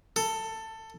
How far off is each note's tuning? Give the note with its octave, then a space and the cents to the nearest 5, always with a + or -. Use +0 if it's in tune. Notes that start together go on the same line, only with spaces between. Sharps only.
A4 +15